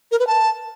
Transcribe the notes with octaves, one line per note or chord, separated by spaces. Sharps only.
A#4
B4
A5